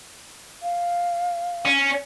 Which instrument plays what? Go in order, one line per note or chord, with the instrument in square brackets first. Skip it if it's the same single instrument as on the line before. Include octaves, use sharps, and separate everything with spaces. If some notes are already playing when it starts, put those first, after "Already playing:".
[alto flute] F5
[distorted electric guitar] C#4